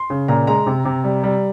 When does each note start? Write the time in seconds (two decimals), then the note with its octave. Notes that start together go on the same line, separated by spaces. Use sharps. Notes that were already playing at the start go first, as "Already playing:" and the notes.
Already playing: C6
0.10 C#3
0.28 A#2 A#5
0.47 G#3 A#5
0.67 C3
0.85 C3
1.04 G3
1.24 G3